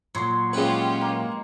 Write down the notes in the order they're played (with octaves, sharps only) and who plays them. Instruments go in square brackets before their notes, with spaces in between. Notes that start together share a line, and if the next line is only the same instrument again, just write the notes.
[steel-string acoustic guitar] A#2 F#3 [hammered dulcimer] C#5 C6
[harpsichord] G#3 B4 [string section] C#4 F4 G4
[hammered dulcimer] A#3